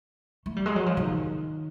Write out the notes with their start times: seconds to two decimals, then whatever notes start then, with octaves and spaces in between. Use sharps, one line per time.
0.46 A3
0.56 G3
0.66 G#3
0.76 F#3
0.86 F3
0.97 D#3